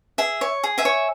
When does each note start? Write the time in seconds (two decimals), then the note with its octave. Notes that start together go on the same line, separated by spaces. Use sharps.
0.18 G#4 E5
0.41 C#5
0.64 G#4
0.78 E5 G#5
0.85 C#5